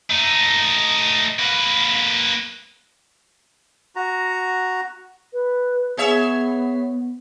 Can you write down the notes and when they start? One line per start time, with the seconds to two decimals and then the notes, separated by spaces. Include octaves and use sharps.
0.10 A3 D#4
1.39 A#3 B4
3.96 F#4 A#5
5.33 B4
5.97 B3 G#4 C#5 E5